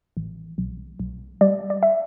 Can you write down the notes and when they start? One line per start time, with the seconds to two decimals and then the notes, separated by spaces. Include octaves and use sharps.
0.17 A1
0.58 B1
1.00 B1
1.41 G3 D5
1.70 D5
1.83 E5